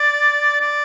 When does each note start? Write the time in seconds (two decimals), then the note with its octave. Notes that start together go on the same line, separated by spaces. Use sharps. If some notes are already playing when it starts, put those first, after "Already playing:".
Already playing: D5
0.61 D5